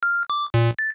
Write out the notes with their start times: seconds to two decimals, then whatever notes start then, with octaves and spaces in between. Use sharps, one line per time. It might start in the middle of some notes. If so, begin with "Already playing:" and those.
0.03 F6
0.30 D6
0.54 A#2
0.79 A6